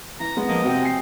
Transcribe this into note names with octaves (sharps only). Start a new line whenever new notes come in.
E3 A#5
G#3 B3
F3 A#3 D#5
C3 C4 F#4 G5
G#5 C7